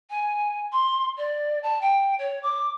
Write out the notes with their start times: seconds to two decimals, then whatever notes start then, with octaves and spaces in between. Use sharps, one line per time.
0.10 G#5
0.72 C6
1.18 D5
1.63 A5
1.82 G5
2.19 C#5
2.43 D6